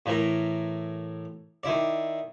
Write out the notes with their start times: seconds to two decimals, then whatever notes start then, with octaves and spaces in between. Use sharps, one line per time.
0.06 A2 E3 A#4
1.63 D#3 E4 D5